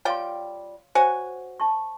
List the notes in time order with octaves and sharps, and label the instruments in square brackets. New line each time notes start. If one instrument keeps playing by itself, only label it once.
[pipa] G3 F4 G5 [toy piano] C#5 F5 C6
[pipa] F#4 F#5 G#5 [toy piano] C5 C#5
[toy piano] A5 C#6